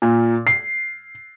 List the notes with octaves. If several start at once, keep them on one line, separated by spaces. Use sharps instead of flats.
A#2
C7